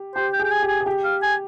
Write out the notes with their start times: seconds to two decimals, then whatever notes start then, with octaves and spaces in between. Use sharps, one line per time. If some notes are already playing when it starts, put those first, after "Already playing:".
Already playing: G4
0.15 G4 C5
0.33 G5
0.39 G#4
0.44 G5
0.51 G#5
0.62 G4
0.68 G#5
0.81 G#4
0.86 G4
1.04 F5
1.22 G#5